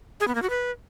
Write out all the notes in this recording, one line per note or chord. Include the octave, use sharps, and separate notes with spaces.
G#4
B3
A#3
F#4
B4